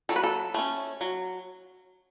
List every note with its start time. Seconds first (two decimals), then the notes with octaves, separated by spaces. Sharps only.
0.09 F#3 A4
0.16 B4
0.23 A4
0.54 A3 C#4
1.01 F#3